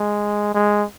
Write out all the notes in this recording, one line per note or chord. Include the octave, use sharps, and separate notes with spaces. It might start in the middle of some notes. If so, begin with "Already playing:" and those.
Already playing: G#3
G#3